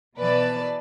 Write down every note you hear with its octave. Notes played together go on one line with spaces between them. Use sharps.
B2 E3 B4 D5 A5